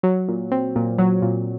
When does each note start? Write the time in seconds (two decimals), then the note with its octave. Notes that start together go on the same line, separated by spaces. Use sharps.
0.03 F#3
0.28 A#2
0.52 C4
0.76 A#2
0.98 F#3
1.22 A#2